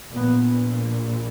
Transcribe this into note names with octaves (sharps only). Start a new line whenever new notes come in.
A#1 A#2 B3